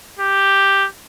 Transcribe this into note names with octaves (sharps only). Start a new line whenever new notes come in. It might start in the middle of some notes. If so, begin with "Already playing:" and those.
G4